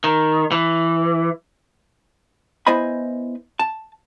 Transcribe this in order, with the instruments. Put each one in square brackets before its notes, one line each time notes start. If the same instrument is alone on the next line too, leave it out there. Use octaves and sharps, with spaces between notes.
[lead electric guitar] D#3
E3
[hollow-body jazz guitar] B3 E4 C5 D#5 G#5 B5
A5